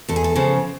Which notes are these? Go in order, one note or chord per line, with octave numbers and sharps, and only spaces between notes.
E2 A4
G#4
A4
C#3 F3